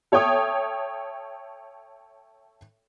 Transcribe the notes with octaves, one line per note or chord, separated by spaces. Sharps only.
A4 C#5 E5 G5 D#6